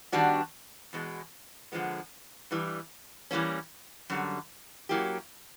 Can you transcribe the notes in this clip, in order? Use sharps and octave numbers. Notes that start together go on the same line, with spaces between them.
D#3 G3 B3 D4 F#4
E2 B2 G#3
D3 F3 G#3 B3
G2 E3 G3
E3 G3 A#3 C#4
F#2 D3 G3
F#3 A#3 C#4 E4 G4